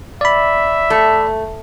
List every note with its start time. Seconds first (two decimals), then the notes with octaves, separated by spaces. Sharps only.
0.21 D5 E5 B5
0.90 A3